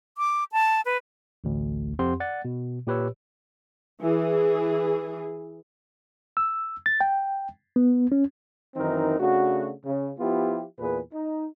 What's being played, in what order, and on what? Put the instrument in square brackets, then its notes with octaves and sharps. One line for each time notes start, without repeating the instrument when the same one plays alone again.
[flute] D6
A5
B4
[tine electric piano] A1 D2
F2 C4 G4 F#5 C6
D5 F#5 A6
B2
A#2 G4 B4 C#5 E6
[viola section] E3 G#4
[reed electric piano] E6
A6
G5
B3
C#4
[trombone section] F#2 D#3 E3 C4 D#4 A#4
C#3 A3 D4 F#4
C#3
F3 B3 E4 F4 G4
E2 A#2 G#4 B4
D#4